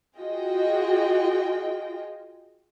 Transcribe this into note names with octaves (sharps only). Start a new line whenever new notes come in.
F4 F#4 G#4 D#5 G5